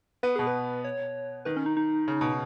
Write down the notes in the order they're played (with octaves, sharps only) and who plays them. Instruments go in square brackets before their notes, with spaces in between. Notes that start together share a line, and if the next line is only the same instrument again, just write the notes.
[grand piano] B3 [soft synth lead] B4
[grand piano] B2 [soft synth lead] G#4
[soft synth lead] B4
C#5
[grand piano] D#3 [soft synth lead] B4
[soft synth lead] C#4
D#4
D#4
[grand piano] C#3
B2